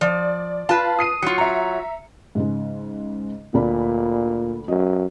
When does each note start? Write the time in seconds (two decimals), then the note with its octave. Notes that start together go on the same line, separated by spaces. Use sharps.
0.01 F3 D5
0.69 F4 B4 A5
0.99 D#6 C7 D#7
1.23 F#3 F4 C#7
1.38 E5 A#5
2.35 G#2 C#3 G#3
3.54 D2 A#2 D5 B5
4.68 F#2 D#5